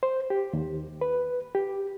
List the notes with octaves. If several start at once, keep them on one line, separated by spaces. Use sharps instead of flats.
C5
G4
D#2
B4
G4